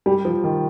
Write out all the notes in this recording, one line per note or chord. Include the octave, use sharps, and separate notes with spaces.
G3
F3
D#3